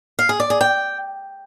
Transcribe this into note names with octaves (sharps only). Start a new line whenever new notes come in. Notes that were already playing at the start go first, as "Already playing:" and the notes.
F5
G#4
D5
G#4
G5